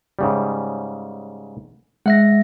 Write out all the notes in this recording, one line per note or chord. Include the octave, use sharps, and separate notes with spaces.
G#2 C#3 G3
G#3 E5 F#5 A#6